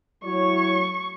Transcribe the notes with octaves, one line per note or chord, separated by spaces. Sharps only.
F#3 E4 C#5 C#6